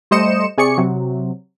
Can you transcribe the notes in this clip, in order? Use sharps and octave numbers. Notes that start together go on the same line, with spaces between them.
G3 A3 C5 D#5 C#7 E7
C3 G#4 D5 C#6 C#7
C3 F#3